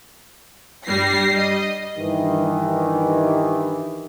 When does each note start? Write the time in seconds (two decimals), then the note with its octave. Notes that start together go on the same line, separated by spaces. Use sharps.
0.86 G2 G3 A#6 C7
1.38 D#5
1.98 G2 D#3 E3